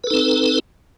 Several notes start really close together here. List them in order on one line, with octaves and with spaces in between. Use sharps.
B4 A4 D#4 C4